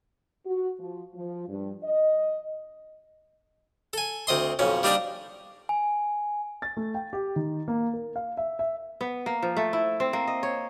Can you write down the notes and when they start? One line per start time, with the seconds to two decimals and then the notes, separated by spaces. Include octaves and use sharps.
0.45 F#4
0.79 F3
1.14 F3
1.48 G2
1.83 D#5
3.93 A4 G#5
4.27 D2 C4 D#5 C6
4.59 B1 F2 C#4
4.83 G3 A#3 D4 D#4 A#4 D5
5.69 G#5
6.62 A6
6.77 A3
6.94 G5
7.13 G4
7.36 D#3
7.68 A#3
7.93 A#4
8.16 F5
8.37 E5
8.59 E5
9.01 B3
9.26 A#3
9.43 F3
9.57 A3
9.73 E4
10.00 C4
10.13 A#3
10.27 D#5
10.43 C#5